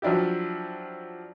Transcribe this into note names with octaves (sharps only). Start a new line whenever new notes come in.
F3 F#3 D4 E4 G4